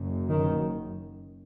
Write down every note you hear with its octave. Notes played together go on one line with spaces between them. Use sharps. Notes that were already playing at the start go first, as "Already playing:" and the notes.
Already playing: F#1 F#2
D#3